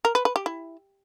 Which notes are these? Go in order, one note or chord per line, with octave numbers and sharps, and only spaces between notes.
A#4
B4
B4
G4
E4